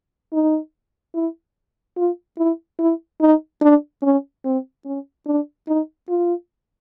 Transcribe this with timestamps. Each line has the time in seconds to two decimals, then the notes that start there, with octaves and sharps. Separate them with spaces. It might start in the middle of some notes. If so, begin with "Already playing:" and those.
0.33 D#4
1.14 E4
1.97 F4
2.38 E4
2.79 E4
3.21 D#4
3.62 D4
4.03 C#4
4.45 C4
4.85 C#4
5.27 D4
5.68 D#4
6.09 F4